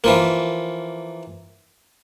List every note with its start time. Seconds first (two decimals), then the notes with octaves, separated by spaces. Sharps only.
0.04 E3 F3 A#3